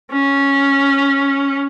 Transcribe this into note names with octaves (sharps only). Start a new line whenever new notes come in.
C#4